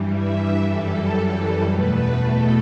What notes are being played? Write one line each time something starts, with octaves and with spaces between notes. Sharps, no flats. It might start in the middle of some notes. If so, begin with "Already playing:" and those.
Already playing: G2 E3 G3
E5
F#2 E3 G3 A4
E2 B2 A3 B4
A4